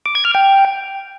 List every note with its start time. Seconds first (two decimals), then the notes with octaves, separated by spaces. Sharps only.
0.06 D6
0.15 G#6
0.25 F6
0.35 G5